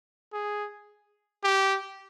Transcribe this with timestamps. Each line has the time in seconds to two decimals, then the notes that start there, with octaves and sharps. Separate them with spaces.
0.33 G#4
1.44 G4